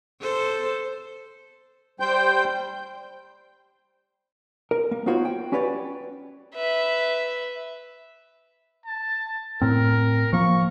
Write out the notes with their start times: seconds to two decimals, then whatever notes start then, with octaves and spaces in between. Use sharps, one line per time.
0.21 A4 C5
2.00 G3 C5 G5 G6
4.71 A#4
4.91 A#3
5.06 B3 D#4 F4 F#4 C5 C#5
5.25 G5
5.52 C#4 F#4 G4 B4 C#5 D5
6.55 B4 E5
8.86 A5
9.61 A2 C4 A#4
10.33 F3 A#3 C#6